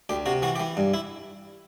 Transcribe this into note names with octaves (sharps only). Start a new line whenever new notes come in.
D2 G4
C3 F#4
E3 F#4
G4
E3
G2
E4